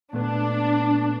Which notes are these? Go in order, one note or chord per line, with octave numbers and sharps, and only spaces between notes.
A#2 A3 B3 D4